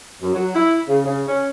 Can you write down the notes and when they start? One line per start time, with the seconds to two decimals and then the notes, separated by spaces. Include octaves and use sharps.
0.22 F#2
0.34 F#3
0.55 E4
0.88 C#3
1.05 C#3
1.27 C#4